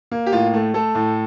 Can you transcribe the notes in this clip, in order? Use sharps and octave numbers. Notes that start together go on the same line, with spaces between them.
A#3
G4
A2 F4
A3
A3 A4
A2